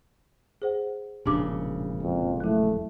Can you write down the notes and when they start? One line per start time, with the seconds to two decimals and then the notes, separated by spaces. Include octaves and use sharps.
0.62 G#4 C5 F#5
1.26 E1 A#1 C#3 D4 G4 D6
2.03 F2
2.40 F#3 A3 E4